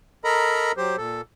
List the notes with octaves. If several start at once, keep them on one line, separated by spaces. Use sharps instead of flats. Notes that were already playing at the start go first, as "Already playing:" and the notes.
A4 A#4 D#5 A#5 B5
F#3 G4 C5
A#2 A4